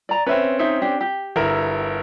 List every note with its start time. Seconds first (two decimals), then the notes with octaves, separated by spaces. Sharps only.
0.09 D5 A#5
0.26 C4 C#4 B4 E5
0.59 D#4 C5 E5
0.82 D4 G4
1.01 G4
1.36 G1 E4 A#4